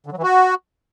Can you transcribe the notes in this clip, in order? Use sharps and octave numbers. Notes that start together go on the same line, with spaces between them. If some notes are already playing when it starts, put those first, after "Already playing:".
D3
F#3
E3
F#4